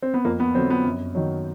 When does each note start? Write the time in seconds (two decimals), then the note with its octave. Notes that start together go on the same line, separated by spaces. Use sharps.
0.02 C4
0.14 B3
0.25 F2 A#3
0.40 B3
0.54 D3 F#3 C4
0.70 B3
0.85 F#2
1.15 D#3 F#3